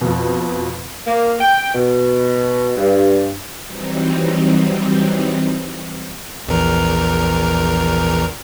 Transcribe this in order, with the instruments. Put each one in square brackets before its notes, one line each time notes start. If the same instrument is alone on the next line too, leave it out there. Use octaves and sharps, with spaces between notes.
[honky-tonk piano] F2 B2
[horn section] A#3
G5
B2
G2
[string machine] E3 F#3 G3 C4 D#4
[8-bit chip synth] A#1 E2 A#4